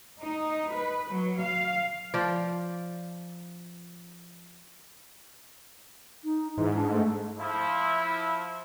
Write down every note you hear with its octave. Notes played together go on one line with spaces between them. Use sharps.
D#4
B4
F#3
F5
F3 D5
D#4
G#2 E3
D4
A3
F3 E4